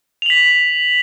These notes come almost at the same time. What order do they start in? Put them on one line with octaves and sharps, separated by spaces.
F7 F#7 B6